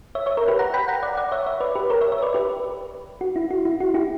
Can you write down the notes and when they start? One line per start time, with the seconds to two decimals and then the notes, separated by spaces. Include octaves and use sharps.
0.15 C#5 E5
0.26 C#5 E5
0.37 A#4 C#5
0.48 G4 B4
0.59 F#5 A#5
0.74 G5 B5
0.88 F#5 A#5
1.03 D5 F#5
1.17 D5 F#5
1.32 C#5 E5
1.46 C#5 E5
1.60 B4 D5
1.75 G4 B4
1.90 A#4 C#5
2.01 C#5 E5
2.12 C#5 E5
2.22 B4 D5
2.34 G4 B4
3.21 F#4
3.36 E4
3.51 F#4
3.65 E4
3.80 F#4
3.94 E4 G4